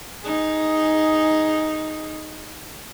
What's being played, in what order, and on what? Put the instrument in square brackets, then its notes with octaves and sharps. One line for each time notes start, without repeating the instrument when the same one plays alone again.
[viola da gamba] D#4 G#4